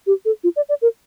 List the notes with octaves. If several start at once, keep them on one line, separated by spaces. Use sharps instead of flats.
G4
A4
F4
D5
D5
A#4